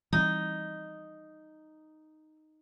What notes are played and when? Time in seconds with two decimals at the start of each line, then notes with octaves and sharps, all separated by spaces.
0.13 E3 G3 C4 D#4